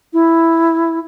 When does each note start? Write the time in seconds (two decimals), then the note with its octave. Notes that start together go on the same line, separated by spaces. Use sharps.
0.13 E4